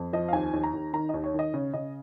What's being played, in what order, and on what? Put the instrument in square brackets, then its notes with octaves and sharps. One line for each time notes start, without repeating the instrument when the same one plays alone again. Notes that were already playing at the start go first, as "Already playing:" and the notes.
Already playing: [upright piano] F2
F3 D#5
F5
D#2 G#5
D#2
A#5
D#2
D#3 A#5
D#2 D#5
C#5
D#3 D#5
C#3 C#5
C#3 D#5